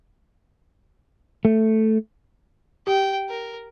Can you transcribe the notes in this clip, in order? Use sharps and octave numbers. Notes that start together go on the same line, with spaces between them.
A3
G4 G5
A#4